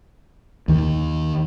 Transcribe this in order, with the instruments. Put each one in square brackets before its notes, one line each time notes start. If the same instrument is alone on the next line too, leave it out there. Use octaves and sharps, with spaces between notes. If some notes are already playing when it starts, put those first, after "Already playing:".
[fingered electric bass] D#2 D#3